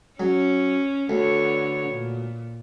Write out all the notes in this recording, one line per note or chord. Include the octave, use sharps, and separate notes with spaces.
F#3 C#4
D2 D3 B3 C#5
A#2